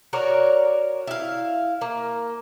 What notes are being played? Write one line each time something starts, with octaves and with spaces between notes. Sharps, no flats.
F#4 A#4 C#5 D5
E4 F5
A#3